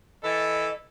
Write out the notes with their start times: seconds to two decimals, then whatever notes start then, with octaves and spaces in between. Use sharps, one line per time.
0.24 E3 A4 D#5